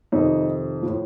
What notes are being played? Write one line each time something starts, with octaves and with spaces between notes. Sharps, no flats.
F2 C3 D#3 D#4
A2 F3